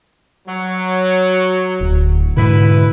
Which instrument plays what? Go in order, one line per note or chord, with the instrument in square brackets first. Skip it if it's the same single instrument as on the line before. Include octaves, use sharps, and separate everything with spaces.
[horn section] F#3
[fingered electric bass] D1
[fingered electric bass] G#2 B2 D3 [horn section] E4 B4